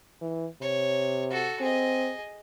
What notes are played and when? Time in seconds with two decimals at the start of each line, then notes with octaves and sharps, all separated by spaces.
0.21 E3
0.61 C3 C#5
1.30 F#4 A4
1.61 C4 G#4 D#5